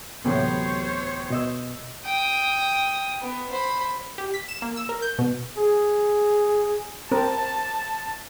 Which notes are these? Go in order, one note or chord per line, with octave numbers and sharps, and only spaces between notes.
D2 A2 C3 E3 F#3 B3 C5 C#5
B2 D#5 E6
G5 D#6
B3
C5 B5
G4
B6
E7
A#3
E6
A#4
G6
B2
G#4
C4 A#4 A5